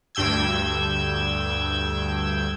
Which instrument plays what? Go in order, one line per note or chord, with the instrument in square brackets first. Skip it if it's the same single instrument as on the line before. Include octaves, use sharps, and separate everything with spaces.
[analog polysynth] D2 G2 G5 E6 G#6